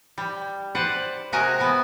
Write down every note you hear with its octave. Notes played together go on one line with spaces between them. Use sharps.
G3
B4 C5 D5 F#5
C3 G#3 F#4 A#4 D#5 G#5
B3 F#5 G#5